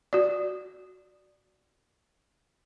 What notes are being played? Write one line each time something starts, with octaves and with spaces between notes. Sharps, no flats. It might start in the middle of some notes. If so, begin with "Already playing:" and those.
F#4 D5